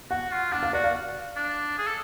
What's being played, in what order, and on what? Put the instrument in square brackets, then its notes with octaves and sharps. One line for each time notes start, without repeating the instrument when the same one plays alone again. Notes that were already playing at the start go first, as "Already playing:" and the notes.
[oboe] F#4 [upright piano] F#5
[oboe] F4
[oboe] D4 [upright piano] F#5
[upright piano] F5
[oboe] F#4 [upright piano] D5
[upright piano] F5
[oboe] D4
G#4
A4